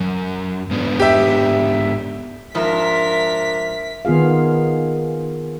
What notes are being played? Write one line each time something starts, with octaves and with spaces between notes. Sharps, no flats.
F#2
G#2 B3 D4
G4 E5
G#2 F3 D4 A#4 E5 B6
D#3 B3 F4 G#4 F5